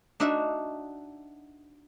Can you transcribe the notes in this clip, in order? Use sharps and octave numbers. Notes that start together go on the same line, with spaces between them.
D4 D#4 F#4 E5